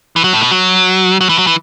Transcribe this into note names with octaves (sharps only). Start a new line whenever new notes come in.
E3
F#3
A2
B2
F#3
F#3
E3
F#3
E3